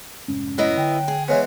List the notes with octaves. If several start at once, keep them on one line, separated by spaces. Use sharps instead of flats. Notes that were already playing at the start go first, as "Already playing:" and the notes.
F1 G#2 C#4
F#3 B3 E4 D#5
D3 G5
G#4
E3 G#3 B3 C#5